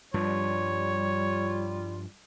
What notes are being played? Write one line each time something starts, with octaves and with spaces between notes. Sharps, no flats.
G2 F3 G3 F4 C#5